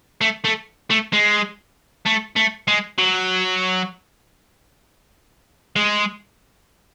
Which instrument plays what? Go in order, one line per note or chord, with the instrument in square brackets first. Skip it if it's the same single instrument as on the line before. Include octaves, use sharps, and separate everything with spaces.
[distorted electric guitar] A3
A3
A3
G#3
A3
A3
G#3
F#3
G#3